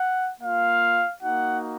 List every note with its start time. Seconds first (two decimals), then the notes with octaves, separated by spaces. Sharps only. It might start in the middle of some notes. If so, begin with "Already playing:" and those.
Already playing: F#5
0.40 A#3 F4 F5
1.21 A#3 D#4 F#4 F#5